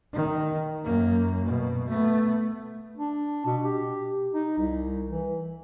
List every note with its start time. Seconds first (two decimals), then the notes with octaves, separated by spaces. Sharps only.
0.13 D#3
0.84 F#2 A#3
1.45 B2
1.89 A3 B3
2.98 D4
3.46 B2
3.63 G4
4.34 D#4
4.58 C2
5.09 E3